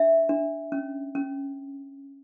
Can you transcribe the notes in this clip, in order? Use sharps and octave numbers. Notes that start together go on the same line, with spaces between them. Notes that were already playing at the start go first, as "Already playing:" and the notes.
Already playing: D4 E5
D4
C#4
C#4